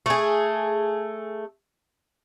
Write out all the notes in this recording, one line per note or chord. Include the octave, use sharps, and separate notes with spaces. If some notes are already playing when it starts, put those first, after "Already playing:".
A3 G#4